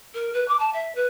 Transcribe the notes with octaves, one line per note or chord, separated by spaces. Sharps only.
A#4
B4
D6
A5
E5
B4